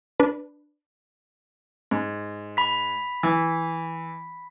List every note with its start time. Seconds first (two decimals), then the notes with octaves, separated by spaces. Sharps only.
0.20 D4 B4
1.91 G#2
2.57 B5 B6
3.23 E3